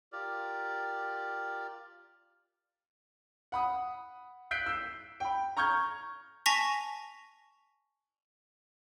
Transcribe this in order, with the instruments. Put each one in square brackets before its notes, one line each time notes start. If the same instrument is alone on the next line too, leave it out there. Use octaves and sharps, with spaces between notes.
[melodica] F4 G4 A#4 D5
[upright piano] F#5 B5 D#6
F#6 G6 B6 C7 D7
E6 G6
G5 B5
A#5 C#6 F6 G6 G#6
[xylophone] G#5 A5 C#6 A#6 B6 F7